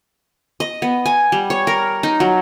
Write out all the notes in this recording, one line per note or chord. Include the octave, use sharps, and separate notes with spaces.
D#5
B3
G#5
G3
C#5
A#4
D#4
F#3